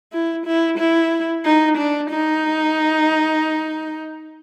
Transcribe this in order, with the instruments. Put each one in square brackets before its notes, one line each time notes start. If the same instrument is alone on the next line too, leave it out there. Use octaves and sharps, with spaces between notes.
[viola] E4
E4
E4
D#4
D4
D#4